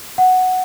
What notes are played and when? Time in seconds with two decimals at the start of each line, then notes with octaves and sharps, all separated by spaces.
0.18 F#5